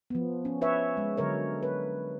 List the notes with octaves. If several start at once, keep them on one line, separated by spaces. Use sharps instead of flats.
F3 B3
C#4
B4 C#5 E5
G#3
D3 F#3 A#4 C#5
B4